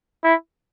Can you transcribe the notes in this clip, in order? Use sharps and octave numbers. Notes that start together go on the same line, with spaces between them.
E4